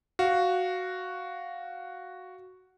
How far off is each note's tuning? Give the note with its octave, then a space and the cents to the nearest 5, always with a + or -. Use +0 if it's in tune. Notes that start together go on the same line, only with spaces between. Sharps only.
F#4 +0 F5 +0